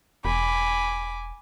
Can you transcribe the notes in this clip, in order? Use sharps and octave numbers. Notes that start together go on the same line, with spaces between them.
E1 G#5 B5 D6